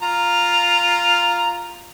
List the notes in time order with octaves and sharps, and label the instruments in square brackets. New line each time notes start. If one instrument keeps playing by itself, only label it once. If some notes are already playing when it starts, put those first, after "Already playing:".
[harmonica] F4 A#5